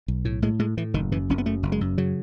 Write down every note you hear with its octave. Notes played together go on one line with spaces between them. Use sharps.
B1
A2
A2 G#3
A2 G#3
A2 E3
F#1 D#3
F#2 E3
F#1 C#4
B3
F#2 A3
F#1
G#3
F#2
C#3 F#3